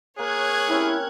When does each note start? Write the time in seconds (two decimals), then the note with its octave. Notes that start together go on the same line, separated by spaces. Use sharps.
0.19 A#3 G#4 C#5 F#6 G#6
0.69 C4 C#4 E4 G4